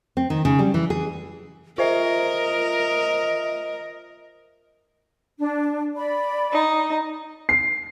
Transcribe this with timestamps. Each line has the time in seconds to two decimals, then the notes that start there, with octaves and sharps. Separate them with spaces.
0.17 C4
0.30 D#3
0.45 C#3
0.59 G3
0.74 E3
0.90 G#4
1.78 F4 A#4 C5 D#5 E5
5.39 D4
5.95 D5 B5
6.52 D#4
7.49 C7